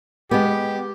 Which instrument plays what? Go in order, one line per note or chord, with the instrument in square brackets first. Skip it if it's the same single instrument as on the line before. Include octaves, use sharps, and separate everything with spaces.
[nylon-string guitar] G#3 B3 [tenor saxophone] G4